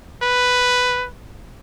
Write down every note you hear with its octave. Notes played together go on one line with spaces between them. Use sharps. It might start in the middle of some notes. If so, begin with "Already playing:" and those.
B4